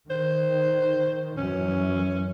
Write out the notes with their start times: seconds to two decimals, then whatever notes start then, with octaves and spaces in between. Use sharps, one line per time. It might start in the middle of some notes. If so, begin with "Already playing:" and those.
0.10 D#3 C5
1.38 F#2 E3 C#4